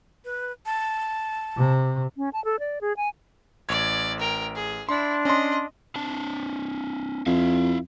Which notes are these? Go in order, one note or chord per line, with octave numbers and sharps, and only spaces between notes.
B4
A5
C3
C#4
A5
A4
D5
G#4
G#5
A1 D5 G#6
A#4 G5
G#4
D4 E4 C6
C#4 D#5 C6
C4 D4 A5
F2 E4 E5 F5